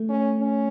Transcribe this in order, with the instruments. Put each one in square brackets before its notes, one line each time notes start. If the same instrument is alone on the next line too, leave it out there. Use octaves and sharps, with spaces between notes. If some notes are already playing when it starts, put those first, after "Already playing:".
Already playing: [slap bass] A3
[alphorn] C#4
C#4